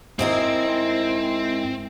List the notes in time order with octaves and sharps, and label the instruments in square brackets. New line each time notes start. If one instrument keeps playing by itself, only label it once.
[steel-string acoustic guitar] G#2 E4 A#4 [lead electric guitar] C4